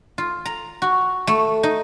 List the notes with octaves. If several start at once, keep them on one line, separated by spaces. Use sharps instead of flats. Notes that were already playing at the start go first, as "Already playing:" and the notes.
F4
A#5
F#4
A3
D#4